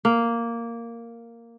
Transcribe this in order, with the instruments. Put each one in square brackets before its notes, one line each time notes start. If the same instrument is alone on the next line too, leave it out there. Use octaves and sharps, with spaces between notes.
[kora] A#3